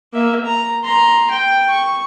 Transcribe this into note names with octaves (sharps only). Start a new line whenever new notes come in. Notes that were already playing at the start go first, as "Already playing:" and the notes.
A#3 E5
A#5
A#5 C6
G5
C#6